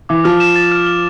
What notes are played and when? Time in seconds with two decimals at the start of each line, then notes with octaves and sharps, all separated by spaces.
0.09 E3 D6
0.24 F3 F6
0.40 E7
0.56 A6
0.71 F6
0.87 G7